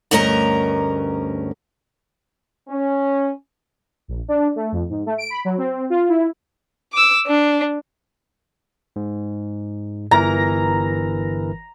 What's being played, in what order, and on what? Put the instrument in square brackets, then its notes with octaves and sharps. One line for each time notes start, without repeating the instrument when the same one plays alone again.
[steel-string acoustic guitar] D2 G2 C#4 A#4 D#5 A#5
[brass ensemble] C#4
[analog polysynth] A#1
D4
A3
F2
G#2
A3
D7
B5
F#3
C4
F4
E4
[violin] D6 E6
D4
[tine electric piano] G#2
[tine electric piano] G1 E3 A#4 [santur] A#5